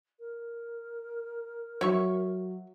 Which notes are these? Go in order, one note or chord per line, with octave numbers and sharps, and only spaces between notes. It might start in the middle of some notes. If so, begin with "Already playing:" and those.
A#4
F#3 C#5 E5 C#6